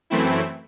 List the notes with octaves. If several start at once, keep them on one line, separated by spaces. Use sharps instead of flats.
F#2 E3 A3 C4 E4